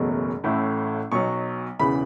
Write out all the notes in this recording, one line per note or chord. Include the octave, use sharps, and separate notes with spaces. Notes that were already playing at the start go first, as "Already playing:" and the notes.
Already playing: F#1 E2 B2 F#3 A3
A1 A2 A3 E4
B1 B2 F#3 C#6
E1 E2 C#3 E3 B5